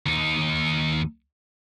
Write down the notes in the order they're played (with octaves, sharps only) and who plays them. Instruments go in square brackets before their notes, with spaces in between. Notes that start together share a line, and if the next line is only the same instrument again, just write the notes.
[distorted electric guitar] D#2 D#4